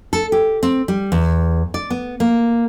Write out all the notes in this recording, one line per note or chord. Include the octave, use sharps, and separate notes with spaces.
A4
G4
C4
G3
E2
D5
B3
A#3